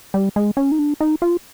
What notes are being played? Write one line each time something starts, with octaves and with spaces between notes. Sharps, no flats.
G3
G#3
C#4
D#4
D4
D#4
F4